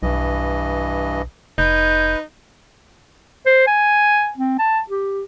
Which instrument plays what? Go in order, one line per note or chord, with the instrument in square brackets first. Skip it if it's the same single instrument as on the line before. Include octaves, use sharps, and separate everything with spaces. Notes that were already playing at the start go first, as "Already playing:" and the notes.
[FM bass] B1 [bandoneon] G2 E3 D#5
[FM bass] F1 [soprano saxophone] D#4 [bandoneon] B4 [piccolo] G6
[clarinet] C5
G#5
C4
A5
G4